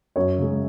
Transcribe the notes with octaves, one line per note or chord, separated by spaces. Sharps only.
F#2 C#5
C#3 G#3